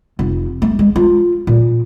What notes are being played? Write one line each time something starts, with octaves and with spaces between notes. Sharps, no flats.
F1
A3
G#3
F4
A#2